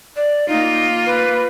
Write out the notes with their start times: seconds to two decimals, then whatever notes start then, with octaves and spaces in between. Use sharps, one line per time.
0.16 D5
0.48 A#3 D#4 F4
1.06 B4